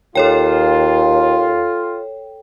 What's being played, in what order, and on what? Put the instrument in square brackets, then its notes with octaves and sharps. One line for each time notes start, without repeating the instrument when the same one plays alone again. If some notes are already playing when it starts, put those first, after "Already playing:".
[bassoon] D#2 [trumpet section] F4 [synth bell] A4 C#5 G5